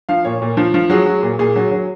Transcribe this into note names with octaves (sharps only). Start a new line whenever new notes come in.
F3 F5
A#2 C#5
A#2
F3
F3
F#3 G#4
F#3
A#2
A#2 G#4
F#3
F#3